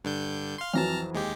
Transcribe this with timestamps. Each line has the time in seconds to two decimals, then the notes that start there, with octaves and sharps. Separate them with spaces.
0.04 G2 D3 G6
0.58 F5 C6
0.73 F2 E3 F#3 A5 A#5 F6
1.14 D#2 G#3 G4